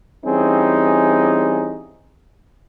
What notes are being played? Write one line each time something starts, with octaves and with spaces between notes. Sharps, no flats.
E3 G3 C4 C#4 D#4 G#4